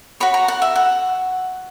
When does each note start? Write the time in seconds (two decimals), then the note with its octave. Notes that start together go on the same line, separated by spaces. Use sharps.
0.20 F#4 C#5 B5
0.34 A#5
0.48 F#5
0.62 E5
0.76 F#5